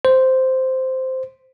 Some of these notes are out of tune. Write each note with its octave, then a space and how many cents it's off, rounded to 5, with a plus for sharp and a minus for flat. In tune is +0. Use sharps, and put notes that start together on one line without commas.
C5 -5